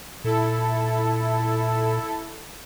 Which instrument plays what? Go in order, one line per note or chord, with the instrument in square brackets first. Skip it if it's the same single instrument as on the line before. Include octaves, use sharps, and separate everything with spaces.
[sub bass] A#2 [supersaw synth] E4 A4